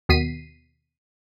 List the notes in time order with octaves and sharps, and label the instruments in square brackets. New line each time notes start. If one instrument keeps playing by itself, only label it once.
[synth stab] D#2 B2 B6 C7 D#7